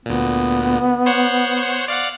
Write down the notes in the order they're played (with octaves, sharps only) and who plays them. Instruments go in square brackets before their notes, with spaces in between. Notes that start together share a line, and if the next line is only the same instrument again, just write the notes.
[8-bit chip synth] D2 A#2 [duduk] B3
[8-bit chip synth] C5 C#5 F#5
D5 F5 F#5